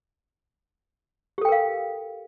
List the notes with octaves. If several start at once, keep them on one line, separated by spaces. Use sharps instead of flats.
G4 A4 A#4 F5 G5